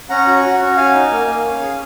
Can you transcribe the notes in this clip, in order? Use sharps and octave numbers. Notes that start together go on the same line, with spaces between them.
C#4 F#5 A#5
F#4
F#4
C#4
F#4 F5 G#5
D#4
A#3
A#3
C#4
G#4